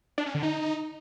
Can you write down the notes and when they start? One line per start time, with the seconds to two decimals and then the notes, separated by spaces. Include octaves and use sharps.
0.18 D4
0.26 C#4
0.35 D3
0.43 D#4